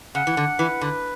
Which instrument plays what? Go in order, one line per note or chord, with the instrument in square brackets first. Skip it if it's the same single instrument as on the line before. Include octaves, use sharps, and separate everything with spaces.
[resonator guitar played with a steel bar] C#3 [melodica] F#5
[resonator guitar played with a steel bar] E3
D3
[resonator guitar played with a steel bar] E3 [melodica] B4
[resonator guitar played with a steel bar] D3